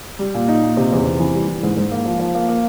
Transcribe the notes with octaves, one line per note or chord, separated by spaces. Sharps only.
G3
A#2
D#4
A#2
C3
E2
C3
E3
G3
E3
G#2
G#2
A#3
F3
F3
A#3
A#3